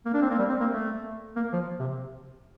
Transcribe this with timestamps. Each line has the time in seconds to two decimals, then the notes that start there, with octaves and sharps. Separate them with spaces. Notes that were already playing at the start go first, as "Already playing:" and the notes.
0.06 A#3
0.14 D4
0.22 C4
0.31 A#3
0.39 G3
0.49 C4
0.60 A#3
0.70 A3
1.36 A#3
1.53 F3
1.80 C3